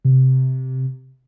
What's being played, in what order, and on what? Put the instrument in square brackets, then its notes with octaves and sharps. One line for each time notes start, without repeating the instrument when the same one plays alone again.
[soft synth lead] C3